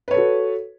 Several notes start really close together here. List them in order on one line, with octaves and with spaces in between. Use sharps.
B4 C#5 A4 F#4